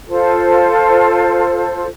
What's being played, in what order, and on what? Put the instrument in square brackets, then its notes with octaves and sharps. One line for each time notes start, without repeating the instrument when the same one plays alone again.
[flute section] F4 A4 C5